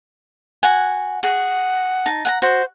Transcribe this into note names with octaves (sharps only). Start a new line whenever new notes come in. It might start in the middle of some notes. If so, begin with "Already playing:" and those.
F#4 F#5 G#5
G#4 F#5
D#4 A5
F#5 G#5 A#5
F#4 C5